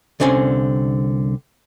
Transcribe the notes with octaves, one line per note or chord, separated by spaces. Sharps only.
C2 D3 C4 C#4 G#5